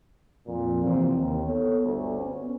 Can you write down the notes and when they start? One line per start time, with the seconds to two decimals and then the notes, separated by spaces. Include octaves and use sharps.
0.46 F2 A#2
0.83 C3 E3 F3 A#3 C4
1.12 D#2
1.46 B3 A4 C#5
1.81 G1 D2
2.21 B3 C#4